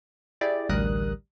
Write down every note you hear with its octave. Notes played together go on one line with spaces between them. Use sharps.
E4 G4 G#4 D5
A1 D2 G3 A#4 D#6 F#6